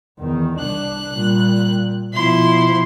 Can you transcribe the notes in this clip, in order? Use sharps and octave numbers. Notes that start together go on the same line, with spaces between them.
E2 D#3
C2 D4 F#6
A#2 G3
B2 F3 E4 C6